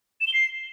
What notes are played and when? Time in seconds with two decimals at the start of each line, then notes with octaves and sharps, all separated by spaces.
0.21 E7
0.27 G7
0.34 C7